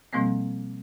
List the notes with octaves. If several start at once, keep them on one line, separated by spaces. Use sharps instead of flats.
B2 F3 G3 A#3 C4